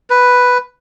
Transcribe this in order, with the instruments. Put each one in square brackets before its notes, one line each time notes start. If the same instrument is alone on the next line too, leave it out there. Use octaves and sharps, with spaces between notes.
[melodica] B4